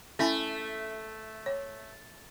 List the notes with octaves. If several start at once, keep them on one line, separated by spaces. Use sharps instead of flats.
A3 C#4 E4 G#5
C#5